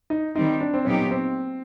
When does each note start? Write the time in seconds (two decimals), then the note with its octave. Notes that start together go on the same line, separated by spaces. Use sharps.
0.10 D#4
0.35 D#3 G3 C4 D#4
0.60 D4
0.74 C4
0.85 A#2 F#3 B3 C#4 D#4 G4
1.11 C4